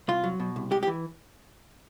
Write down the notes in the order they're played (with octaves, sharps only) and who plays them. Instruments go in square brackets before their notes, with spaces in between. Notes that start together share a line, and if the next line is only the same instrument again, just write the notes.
[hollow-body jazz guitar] C2 F4
F#3
B2
C2
G#3 G4
G4
E3